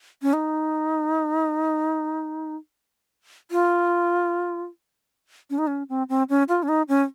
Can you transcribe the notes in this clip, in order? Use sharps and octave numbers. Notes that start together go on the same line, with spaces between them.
C#4
D#4
F4
C#4
D#4
C#4
C4
C4
C#4
F4
C#4
D#4
C#4